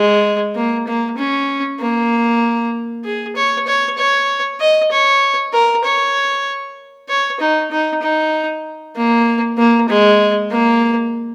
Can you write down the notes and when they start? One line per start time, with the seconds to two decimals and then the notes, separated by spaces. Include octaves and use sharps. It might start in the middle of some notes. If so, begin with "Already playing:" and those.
Already playing: G#3
0.55 A#3
0.87 A#3
1.18 C#4
1.80 A#3
3.05 G#4
3.36 C#5
3.67 C#5
3.97 C#5
4.60 D#5
4.91 C#5
5.53 A#4
5.84 C#5
7.08 C#5
7.40 D#4
7.71 D#4
8.02 D#4
8.96 A#3
9.58 A#3
9.89 G#3
10.51 A#3